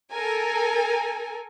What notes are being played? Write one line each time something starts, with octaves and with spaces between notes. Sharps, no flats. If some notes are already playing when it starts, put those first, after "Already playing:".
A4 A#4 G#5